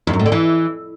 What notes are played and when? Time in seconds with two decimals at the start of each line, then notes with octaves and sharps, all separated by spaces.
0.07 E2
0.13 F#2
0.20 A2
0.26 D3
0.32 E3